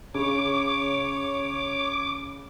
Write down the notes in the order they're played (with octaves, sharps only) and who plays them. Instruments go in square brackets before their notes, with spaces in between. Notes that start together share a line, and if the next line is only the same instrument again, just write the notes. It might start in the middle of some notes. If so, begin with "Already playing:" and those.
[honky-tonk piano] C#3 [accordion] C#5 [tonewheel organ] D6